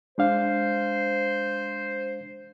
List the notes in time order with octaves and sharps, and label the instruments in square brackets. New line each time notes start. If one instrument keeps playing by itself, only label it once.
[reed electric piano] G#3 D4 F5 [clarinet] C5